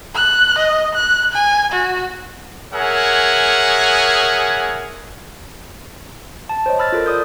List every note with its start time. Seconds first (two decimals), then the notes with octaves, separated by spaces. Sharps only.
0.15 F#6
0.58 D#5
0.95 F#6
1.32 G#5
1.72 F#4
2.73 G#4 A#4 C#5 E5 F#5 G#5
6.49 A5
6.66 C5 C#5 D#5
6.79 B5 E6 F6 A6
6.92 F4 A4 A#4
7.06 D5 D#6 G6